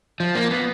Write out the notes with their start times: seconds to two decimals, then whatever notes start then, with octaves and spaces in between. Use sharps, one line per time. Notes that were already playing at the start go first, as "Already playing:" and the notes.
0.20 F3
0.35 A#3
0.51 B3